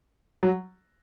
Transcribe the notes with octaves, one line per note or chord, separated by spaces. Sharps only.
F#3